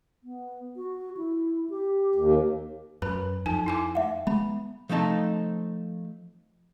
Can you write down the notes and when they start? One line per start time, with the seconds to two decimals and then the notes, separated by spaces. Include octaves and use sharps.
0.24 B3
0.77 F#4
1.17 E4
1.70 G4
2.15 D#2
3.02 F#2 B4 B5
3.46 F2 D#4 G#5
3.66 E4 G#5 D6
3.95 E5 F#5
4.27 G#3 B3 B5
4.89 F3 A3 C4 D#4 A5